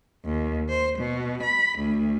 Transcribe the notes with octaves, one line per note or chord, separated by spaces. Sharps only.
D#2
C5
B2
B5
D2